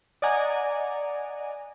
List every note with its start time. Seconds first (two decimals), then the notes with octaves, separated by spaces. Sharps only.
0.22 D5 D#5 F#5 G#5 A#5